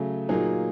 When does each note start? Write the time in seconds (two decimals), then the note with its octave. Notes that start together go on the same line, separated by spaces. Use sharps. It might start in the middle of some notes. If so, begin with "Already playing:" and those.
Already playing: C#3 F#3 A3
0.29 A#2 F#3 A#3 D#4 G#4